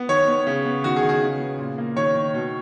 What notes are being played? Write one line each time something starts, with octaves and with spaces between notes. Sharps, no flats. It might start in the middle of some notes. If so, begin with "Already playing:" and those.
Already playing: B3
D#3 C#5
B3
C#3
B3
D#3 F#4
G#4
D#3
G#4
C#3
B3
A#2
A#3
D#3 C#5
D#3
B2